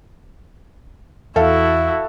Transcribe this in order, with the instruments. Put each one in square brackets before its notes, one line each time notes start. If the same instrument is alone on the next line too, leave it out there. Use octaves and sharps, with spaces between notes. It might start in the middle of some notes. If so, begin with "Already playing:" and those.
[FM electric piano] E2 [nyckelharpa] E4 F#4 [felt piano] A4 E5 F5